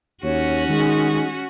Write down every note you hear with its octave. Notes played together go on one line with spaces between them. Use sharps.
D#2 C#4 F#4 C#5
D#3 G#3